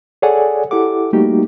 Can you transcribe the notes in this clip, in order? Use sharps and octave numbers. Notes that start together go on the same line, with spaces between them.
G#4 A4 C#5 D5 F#5 G#5
E4 G4 A4 F#5 D6
G3 A3 A#3 D#4 F#4 G4